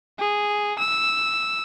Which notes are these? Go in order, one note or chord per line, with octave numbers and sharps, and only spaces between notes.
G#4
E6